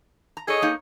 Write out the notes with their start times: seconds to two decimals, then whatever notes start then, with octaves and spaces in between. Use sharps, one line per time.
0.37 A#5
0.48 G#4 A4 C#5 D#5
0.62 A#3 D#4